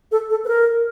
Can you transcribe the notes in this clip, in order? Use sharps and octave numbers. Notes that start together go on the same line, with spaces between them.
A4
A4
B4
A#4